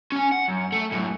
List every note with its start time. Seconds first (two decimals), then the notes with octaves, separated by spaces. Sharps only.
0.12 C#4 G#5
0.32 F#5
0.48 F#2
0.72 A3
0.92 F#2 A2